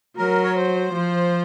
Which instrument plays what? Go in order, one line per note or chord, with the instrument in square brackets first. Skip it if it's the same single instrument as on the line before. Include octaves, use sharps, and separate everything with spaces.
[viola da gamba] F#3 [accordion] A#4
[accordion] C#5
C5
[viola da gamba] F3